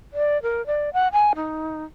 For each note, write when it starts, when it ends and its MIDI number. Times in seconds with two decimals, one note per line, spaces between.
0.14 0.41 74
0.42 0.65 70
0.67 0.90 74
0.93 1.08 78
1.12 1.33 80
1.36 1.84 63